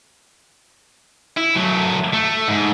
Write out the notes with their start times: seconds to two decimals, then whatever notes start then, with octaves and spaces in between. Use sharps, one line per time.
1.38 E4
1.56 F#3 A3
2.13 A3
2.48 G#2